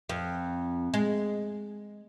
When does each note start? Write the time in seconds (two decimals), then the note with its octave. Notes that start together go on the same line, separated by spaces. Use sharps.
0.09 F2
0.94 G#3